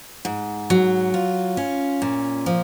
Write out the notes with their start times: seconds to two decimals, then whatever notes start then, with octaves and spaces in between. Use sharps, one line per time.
0.25 G#2
0.70 F#3
1.14 F4
1.57 C#4
2.02 A#2
2.46 F3